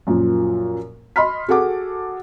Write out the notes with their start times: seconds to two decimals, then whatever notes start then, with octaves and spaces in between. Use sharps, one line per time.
0.07 F#2 A#2 F3
1.16 D#5 B5 C6 F6 B6
1.48 F#4 G#4 A4 F#5 D6